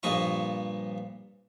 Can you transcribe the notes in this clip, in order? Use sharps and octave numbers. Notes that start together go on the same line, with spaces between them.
G2 A#2 F3 D#5 C#6